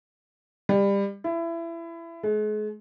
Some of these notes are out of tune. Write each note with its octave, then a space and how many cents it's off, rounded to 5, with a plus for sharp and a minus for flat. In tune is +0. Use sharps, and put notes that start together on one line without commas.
G3 +25
E4 +25
G#3 +40